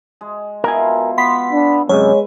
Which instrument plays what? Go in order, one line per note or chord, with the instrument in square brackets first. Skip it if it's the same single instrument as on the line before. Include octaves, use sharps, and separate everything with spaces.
[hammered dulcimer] G#3
[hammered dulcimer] B2 E4 F4 [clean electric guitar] A#4 G#5
[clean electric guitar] B3 [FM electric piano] C6 B6
[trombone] D4
[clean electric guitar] F#2 C3 [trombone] G#3 [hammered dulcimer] B4 B5 [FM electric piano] C#5